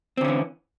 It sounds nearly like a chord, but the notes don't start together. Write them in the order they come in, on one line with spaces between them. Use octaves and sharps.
C4 D3 C#4 E3